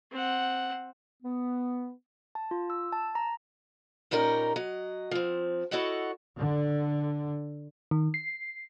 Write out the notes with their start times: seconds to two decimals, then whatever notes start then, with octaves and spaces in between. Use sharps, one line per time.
0.12 C4 F#5
1.23 B3
2.35 A5
2.51 F4
2.70 E6
2.93 A5
3.15 A#5
4.11 A#2 G3 C#4 D#4 A#4
4.56 F#3 D#5
5.11 F3 C4
5.71 E4 F#4 A4 C#5 D#5 F#5
6.38 D3
7.91 D#3
8.14 C7